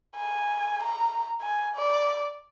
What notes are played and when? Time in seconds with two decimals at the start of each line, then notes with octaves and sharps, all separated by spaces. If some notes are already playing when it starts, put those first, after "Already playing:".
0.16 G#5
0.83 A#5
1.41 G#5
1.76 D5